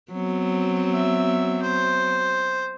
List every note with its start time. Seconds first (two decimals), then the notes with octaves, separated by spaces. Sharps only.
0.12 F#3 B3 C4
0.93 E5
1.62 C5